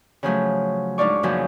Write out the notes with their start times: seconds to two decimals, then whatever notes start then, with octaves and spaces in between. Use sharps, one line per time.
0.23 C#3 F3 F#3 A3
0.98 G#2 D4 D#4 F4 D5 C#6
1.23 F#2 A#2 C#3 F3 F#3